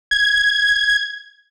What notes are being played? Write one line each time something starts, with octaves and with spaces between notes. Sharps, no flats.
G#6